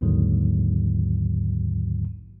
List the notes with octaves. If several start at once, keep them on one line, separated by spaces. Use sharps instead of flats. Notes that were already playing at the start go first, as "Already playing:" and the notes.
A#1 D#2 G#2 D3 D#3 F#3